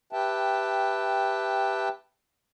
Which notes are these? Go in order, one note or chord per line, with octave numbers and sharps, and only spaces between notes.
G4 B4 E5 G5 A5